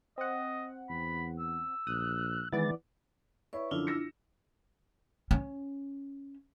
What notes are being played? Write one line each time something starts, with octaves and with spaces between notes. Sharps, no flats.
C4 D#5 F#5
E2 B5
E6
A#1 D#6 F#6
D#3 E3 G#3 B3 D5 A6
E4 B4 C#5 D5 E5 C#6
F#2 D3 F3 D4 E4 F4
E6 A#6 C#7
C#4